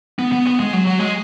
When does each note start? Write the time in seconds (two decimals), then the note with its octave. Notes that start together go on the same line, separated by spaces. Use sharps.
0.19 B3
0.32 B3
0.47 B3
0.60 G#3
0.73 F#3
0.87 F#3
0.99 G#3